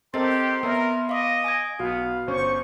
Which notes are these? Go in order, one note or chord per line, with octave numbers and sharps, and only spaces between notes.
C4 G4 A4 A#4 D#5 C6 A6
B3 A#4 D5 E5 E6
D#5 F5 D6
G#5 D#6 G#6
B1 B3 F#4 F5
G1 C#4 C5 C#6